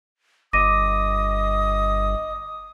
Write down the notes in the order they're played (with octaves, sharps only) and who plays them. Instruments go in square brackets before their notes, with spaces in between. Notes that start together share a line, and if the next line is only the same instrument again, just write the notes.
[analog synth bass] G1 [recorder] D#5 [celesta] D6 A#6 D#7 [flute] D#6